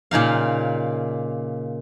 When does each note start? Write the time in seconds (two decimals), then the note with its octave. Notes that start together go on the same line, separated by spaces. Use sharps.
0.11 A#2 C#3 D#4 F5